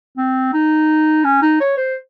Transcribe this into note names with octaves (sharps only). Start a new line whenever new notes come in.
C4
D#4
C#4
D#4
C#5
C5